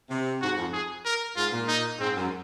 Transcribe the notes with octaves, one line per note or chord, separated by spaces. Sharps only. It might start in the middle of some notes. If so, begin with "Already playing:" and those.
C3
G#2 F#4
F2
G#4
A#4
G#2 F4
A#2
D#4
G#2 C4
F#2